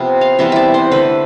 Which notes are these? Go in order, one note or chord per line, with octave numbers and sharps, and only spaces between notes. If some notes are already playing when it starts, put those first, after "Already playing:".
Already playing: C3 F3 B3
F5
C3 E3 G3 B3 E5
D5 E5
C5
D3 A3 B4